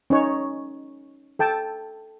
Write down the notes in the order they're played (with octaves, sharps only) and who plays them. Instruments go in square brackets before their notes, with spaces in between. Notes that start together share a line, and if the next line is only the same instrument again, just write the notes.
[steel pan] C#4 D#4 C#5
A4 G5 A5